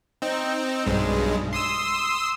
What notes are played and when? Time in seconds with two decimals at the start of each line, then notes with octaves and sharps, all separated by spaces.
0.22 C4 D#4
0.86 B1 G2 G#3
1.53 C6 D#6 E6